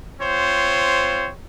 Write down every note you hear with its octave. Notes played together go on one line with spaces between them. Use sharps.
C4 F4 C5 C#5